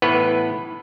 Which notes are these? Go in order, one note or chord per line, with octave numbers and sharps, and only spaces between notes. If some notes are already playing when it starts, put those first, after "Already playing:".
A2 E3 B3 B4